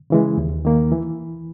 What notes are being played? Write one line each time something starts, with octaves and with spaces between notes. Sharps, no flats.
C#3 E3 G#3
D#2
D#3 A#3
E3